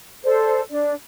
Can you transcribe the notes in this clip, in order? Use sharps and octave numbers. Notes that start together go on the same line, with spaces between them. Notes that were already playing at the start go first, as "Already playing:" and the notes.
A4 C5 D5
D4 D5